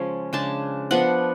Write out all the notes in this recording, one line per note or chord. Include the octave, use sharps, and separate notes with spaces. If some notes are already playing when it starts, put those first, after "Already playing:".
Already playing: C#3 F3 G#3 C#4
C#3 G#3 D4 A5
F3 B3 D4 F#5